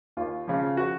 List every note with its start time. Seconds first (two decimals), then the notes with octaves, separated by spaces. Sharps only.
0.17 D#2 F4
0.48 C#3 F3
0.77 F#4